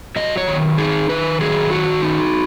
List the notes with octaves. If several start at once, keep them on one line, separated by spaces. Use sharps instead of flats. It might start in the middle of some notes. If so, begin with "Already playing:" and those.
F#3 D#5
C#5
D#3
D#4 G#4
D#3 B4
F#3 G#4
D#3 F#4
D#4